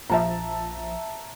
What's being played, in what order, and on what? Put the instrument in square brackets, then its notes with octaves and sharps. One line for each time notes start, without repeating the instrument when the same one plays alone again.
[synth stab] A#1 F3 [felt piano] E5 A5 A#5